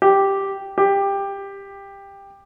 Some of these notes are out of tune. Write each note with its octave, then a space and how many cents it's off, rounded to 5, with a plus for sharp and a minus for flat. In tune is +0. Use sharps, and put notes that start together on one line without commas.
G4 +0
G4 +15